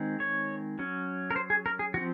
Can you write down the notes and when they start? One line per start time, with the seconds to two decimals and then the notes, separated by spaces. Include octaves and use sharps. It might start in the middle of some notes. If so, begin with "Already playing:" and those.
Already playing: D#3 G#3 C4
0.20 C#5
0.79 F#3 C#4
1.31 A#4
1.36 C5
1.50 G#4
1.66 A#4
1.79 G#4
1.94 F3 C4 F#4